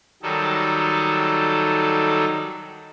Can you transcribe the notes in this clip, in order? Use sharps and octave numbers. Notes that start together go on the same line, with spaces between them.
D#3 F#3 G3 D#4 A4